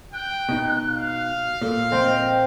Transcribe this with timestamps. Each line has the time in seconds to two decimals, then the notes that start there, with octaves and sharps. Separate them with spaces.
0.14 G5 F#6
0.49 B2 D#4
0.90 F5
1.61 A#2 A4
1.92 C4 D#5 G5